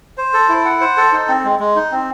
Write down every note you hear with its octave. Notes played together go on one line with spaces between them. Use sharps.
C5
A4
E4
F#5
C5
A4
D#4
C4
G#3
G#3
D#4
C4